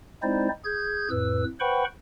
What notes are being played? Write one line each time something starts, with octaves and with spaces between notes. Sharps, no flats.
G#3 C4 D#4 E4 C5 D5
G#4 G6 G#6
F2 A2 B4 E6
B4 C5 F#5 G5 B5 C#6